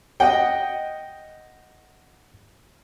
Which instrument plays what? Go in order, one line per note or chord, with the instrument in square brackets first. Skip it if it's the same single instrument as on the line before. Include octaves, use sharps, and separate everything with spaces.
[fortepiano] D#5 F#5 G5